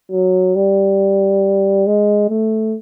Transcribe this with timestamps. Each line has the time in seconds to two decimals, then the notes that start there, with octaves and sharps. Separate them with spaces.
0.11 F#3
0.55 G3
1.87 G#3
2.30 A3